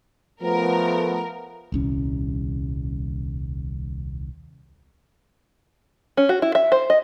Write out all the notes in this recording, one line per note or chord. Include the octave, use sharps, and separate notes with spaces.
F3 A3 B3 A#4
D#1 C2 C#4
C#4
F#4
E4
E5
C5
D#5